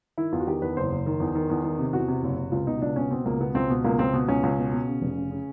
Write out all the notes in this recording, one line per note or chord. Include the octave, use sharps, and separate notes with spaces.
D#3 E4
E2 F4
F#4
D#3 G4
E2 B4
F#1 C5
F#1
D#3
E2
D#3
E2
D#3
C3
E2 F#4
C3
F#1
C3
C#2 F4
B2 D#4
C#2 D4
B2 C#4
B2 C4
C#2 A#3
B2 B3
C#2 C4
B2
C#2 A#3
C#2 C4
B2
C#2 C#4
C#2
B2
B2
C#3
F1
C#3
C#3